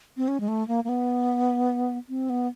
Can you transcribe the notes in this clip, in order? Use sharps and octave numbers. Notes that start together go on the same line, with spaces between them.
C4
C#4
G#3
A3
A#3
A#3
B3
C4
B3